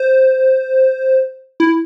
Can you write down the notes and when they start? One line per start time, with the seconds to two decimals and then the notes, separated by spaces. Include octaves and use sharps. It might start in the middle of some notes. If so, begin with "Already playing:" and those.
Already playing: C5
1.60 E4